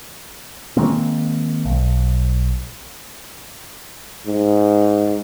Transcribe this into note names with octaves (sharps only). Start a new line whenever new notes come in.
D#3 G#3 A#3 C4
B1
G#2